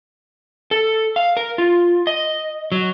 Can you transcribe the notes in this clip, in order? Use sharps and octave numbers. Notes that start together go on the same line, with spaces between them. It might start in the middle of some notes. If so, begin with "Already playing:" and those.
A4
F5
A#4
F4
D#5
F#3